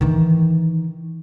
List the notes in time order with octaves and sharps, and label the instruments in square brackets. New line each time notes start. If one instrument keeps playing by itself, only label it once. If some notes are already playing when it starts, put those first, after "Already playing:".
[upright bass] D#3 E3